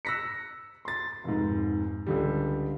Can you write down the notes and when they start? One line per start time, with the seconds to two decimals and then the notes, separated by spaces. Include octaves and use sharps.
0.05 E6 F#6 A#6 B6 C#7
0.85 C6 A6
1.24 F1 G#2
2.07 C#2 D3 G3